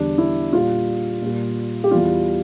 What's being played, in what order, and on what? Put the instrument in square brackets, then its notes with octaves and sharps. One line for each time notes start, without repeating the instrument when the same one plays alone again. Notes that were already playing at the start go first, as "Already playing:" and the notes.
Already playing: [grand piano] E2 D3 G3 D4
E4
A#2 G3 F4
A#2 G3
G4
E2 E3 G3 F4